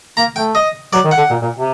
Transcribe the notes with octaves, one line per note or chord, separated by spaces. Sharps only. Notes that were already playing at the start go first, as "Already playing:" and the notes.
A#3 A#5
A3 G5
D#5
F#3 D5
D#3
F#5
D3
A#2
A#2
C3